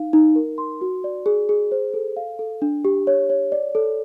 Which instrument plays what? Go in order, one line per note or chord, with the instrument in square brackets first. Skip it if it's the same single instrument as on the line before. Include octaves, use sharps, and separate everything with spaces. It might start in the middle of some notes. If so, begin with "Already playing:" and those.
Already playing: [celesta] D#4 F5
D#4
A#4
C6
F#4
D5
G#4
G#4
C5
A4
F5
A4
D4
G4
C#5
C#5
D5
A4